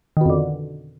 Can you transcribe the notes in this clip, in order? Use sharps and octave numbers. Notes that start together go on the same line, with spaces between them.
F2 B2 D3 D#3